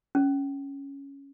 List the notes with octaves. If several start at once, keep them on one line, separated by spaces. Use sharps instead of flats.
C#4